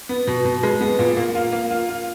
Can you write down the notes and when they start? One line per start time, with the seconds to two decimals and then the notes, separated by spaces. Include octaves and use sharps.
0.09 B3
0.27 B2
0.45 B2
0.63 G#3
0.81 B3
0.99 A#2
1.17 A#3
1.35 F4
1.53 A#3
1.71 F4
1.89 F4